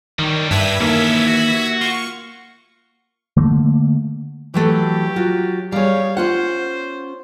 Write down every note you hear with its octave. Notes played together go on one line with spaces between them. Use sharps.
D#3 F#3 G3
G2 D4 G4 B4 E5 G#6 B6
D#2 E3 A#3 C#4 A4
F#4
F4 C#6
D3 A3 A#3
E3 F#3 A3 G4
F#3 F4 F#4
G3 G#4 C#5 F5
C#4 F4 C5 F#5